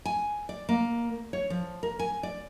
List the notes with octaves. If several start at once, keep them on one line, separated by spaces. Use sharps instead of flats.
G#5
D5
A#3
C#5
F3
A#4
G#5
D5